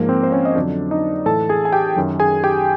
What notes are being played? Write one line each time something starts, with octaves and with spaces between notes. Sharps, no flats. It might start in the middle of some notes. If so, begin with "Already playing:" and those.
Already playing: G#2 F3 A#3 A#4
C4 C5
C5
C#4 C#5
D#5
F2 D3 F#3 D4 D5
D#4 D#5
A2 E3 A4 A5
G#4 G#5
G#5
G4 G5
F#2 D#3 F#3
G#4 G#5
G4 G5